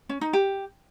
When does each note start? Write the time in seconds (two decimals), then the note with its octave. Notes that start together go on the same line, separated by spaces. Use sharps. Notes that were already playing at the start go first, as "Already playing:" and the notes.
0.09 C#4
0.21 D#4
0.33 G4